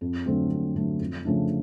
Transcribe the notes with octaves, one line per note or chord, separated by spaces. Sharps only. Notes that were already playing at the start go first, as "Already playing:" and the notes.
F2
D3 F#3 A3 C4
F2
D3 F#3 A3 C4
F2
C#3 F3 A3 D4